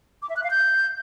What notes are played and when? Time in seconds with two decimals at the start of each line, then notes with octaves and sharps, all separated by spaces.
0.22 D6
0.29 E5
0.36 F#6
0.44 F5
0.51 G6